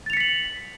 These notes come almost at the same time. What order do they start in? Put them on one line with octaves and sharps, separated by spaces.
A6 F7 C#7 B6 F#7